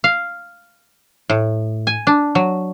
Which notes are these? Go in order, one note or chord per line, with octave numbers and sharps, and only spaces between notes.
F5
A2
G#5
D4
F#3